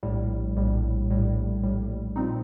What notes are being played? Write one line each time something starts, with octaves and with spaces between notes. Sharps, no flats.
A#1 A2 G3
A#1 A2 G3
A#1 A2 G3
A#1 A2 G3
A#2 G3 C4 D#4